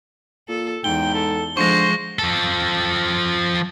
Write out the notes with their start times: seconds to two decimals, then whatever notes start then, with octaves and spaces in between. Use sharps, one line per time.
0.49 A#2 A4
0.84 E2 G#2 G5 G7
1.14 A4
1.57 D3 F3 G#3 C5 C#6 A#6
2.19 F3 A4